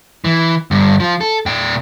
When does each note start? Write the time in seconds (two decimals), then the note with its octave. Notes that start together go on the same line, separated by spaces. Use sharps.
0.25 E3
0.71 G2 D3
1.00 F3 F4
1.21 A4
1.46 A#2 G5